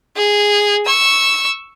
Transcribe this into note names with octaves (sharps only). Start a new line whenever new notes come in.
G#4
C#6 E6